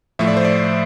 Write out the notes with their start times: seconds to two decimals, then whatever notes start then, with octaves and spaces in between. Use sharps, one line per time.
0.19 A2 F3 A3 E5
0.28 D5
0.37 C5
0.45 D5